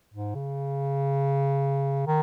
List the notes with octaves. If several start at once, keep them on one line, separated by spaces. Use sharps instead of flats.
G#2
C#3
D#3